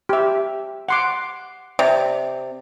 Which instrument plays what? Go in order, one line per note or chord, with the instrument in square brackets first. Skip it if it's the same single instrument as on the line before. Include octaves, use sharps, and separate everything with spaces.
[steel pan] G4 E5
F#5 C6 D6
[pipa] C3 [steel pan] D5